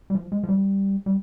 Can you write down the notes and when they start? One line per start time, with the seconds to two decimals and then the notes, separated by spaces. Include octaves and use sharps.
0.10 G3
0.15 F3
0.32 G#3
0.44 F3
0.49 G3
1.06 G3